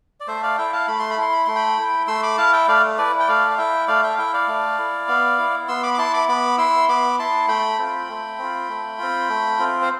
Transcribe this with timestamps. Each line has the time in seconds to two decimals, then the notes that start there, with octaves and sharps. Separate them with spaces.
0.20 D5
0.27 A3 C5 E5
0.43 D5 F5
0.58 E4 E5 G5
0.73 F5 A5
0.88 A3 B5
0.99 C6
1.11 B5
1.17 E4 C6
1.33 B5
1.45 A3 C6
1.56 G5 B5
1.77 E4
2.07 A3 C6 E6
2.23 B5 D6
2.37 E4 F5 A5
2.53 E5 G5
2.68 A3 D5 F5
2.98 E4 B4 D5
3.19 G5
3.28 A3 D5 F5
3.51 F5
3.58 E4 E5 G5
3.88 A3 D5 F5
4.03 E5 G5
4.14 F5
4.18 E4 E5 G5
4.34 D5 F5
4.48 A3
4.79 E4
5.08 B3
5.38 E4
5.68 B3 C6 E6
5.83 B5 D6
5.94 D6
5.98 E4 A5 C6
6.14 B5 D6
6.28 B3 B5 D6
6.58 E4 C6 E6
6.89 B3 B5 D6
7.19 E4 A5 C6
7.48 A3 G5 B5
7.79 C4 F4
8.09 A3
8.38 C4 F4
8.69 A3
8.98 C4 F4
9.29 A3
9.59 C4 F4
9.82 C5